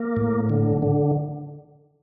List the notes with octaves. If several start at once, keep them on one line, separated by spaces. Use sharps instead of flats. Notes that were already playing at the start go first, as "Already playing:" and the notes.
Already playing: A#3
A2
D3
D3